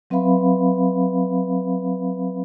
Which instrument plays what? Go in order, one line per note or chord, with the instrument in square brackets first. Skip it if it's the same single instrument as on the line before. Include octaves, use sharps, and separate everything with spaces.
[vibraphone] F#3 C4 B4 E5 F5 B5